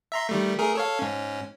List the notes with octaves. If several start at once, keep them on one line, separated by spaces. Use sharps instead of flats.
E5 A#5 C6
D#3 G3 A3
A3 G#4 A#4
A4 C#5 F5
G#2 C#4